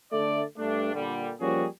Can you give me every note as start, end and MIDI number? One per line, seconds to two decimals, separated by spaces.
0.13 0.43 50
0.13 0.43 57
0.13 0.43 74
0.58 0.94 43
0.58 0.94 57
0.58 0.94 62
0.94 1.32 46
0.94 1.32 50
0.94 1.32 55
1.41 1.65 53
1.41 1.65 55
1.41 1.65 58
1.41 1.65 61
1.41 1.65 66
1.41 1.65 68